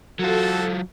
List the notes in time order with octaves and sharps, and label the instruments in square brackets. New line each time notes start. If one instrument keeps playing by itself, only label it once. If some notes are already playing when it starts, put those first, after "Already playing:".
[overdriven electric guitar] F#3 F4 [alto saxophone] F#4 [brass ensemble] A4